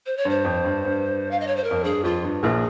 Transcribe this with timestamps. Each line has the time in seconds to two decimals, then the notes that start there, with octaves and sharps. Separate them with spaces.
0.06 C5
0.17 C#5
0.25 G2 C5
0.45 F2
0.65 G2
0.85 G2
1.31 F5
1.40 D#5
1.47 C#5
1.56 C5
1.63 A#4
1.71 F2
1.84 G2 G#4
2.04 F2 F4
2.23 G2
2.43 A#1 A#2 G#4